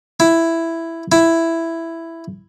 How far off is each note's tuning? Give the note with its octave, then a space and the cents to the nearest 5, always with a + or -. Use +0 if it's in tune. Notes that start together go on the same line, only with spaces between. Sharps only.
E4 +5
E4 +5